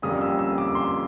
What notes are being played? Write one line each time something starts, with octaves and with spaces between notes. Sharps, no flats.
F2 D3 G3 A#3 C#4 D#6
E6
E6
D6
C6